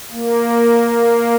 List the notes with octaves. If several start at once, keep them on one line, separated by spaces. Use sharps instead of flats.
A#3